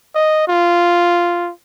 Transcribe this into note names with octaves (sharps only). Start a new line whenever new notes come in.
D#5
F4